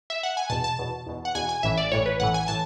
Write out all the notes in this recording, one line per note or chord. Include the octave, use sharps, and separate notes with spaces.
E5
F#5
G#5
E2 B2 A5
A5
E2 B2
E2 B2
F#5
E2 B2 G#5
G#5
A1 A2 E3 E5
D5
A1 A2 E3 C#5
B4
A1 A2 E3 F#5
G#5
A2 E3 A5